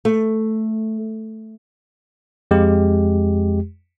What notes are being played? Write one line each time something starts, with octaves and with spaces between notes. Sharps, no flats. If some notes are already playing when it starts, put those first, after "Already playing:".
A3
F2 G#3 G4